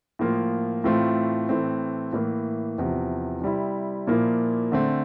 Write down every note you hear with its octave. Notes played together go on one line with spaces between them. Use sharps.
A2 F3 A#3 F4
A2 E3 A3 C4 F4
A2 E3 A3 C4
A2 E3 A#3
E2 C3 F3
C3 G3 C4 E4
A#2 F3 A#3 E4
D3 A3 C4